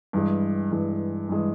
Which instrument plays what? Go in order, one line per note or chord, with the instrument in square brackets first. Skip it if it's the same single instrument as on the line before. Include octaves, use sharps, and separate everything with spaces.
[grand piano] G2 E3 G#3
G2 E3 G#3
G2 E3 G#3